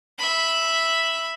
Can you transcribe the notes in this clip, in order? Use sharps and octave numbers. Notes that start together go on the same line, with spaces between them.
E5 B5